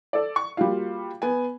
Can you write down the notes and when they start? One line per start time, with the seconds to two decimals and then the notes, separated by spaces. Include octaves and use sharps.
0.13 A4 D5
0.36 C#6
0.57 G3 A#3 F4 F#4 F5
1.22 B3 G#5